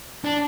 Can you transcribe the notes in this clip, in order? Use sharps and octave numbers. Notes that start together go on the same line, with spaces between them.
D4